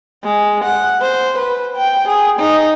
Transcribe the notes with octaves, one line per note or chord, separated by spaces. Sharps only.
G#3
F#5
C5
B4
G5
G#4
D#4